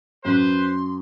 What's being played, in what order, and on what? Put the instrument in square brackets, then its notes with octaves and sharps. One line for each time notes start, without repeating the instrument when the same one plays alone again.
[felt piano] F#2 [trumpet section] B4 C5 [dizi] C6